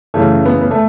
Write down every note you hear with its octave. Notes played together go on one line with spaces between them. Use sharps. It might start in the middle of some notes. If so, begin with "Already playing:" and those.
F#2 C#3 E3 A3
B3
B3
A3